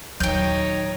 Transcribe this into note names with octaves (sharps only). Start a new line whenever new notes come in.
D#2 A#2 F#3 D#4 C#5 G5 G6